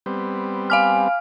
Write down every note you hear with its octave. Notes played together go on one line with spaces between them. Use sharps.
G3 B3 C4
F5 G#5 F6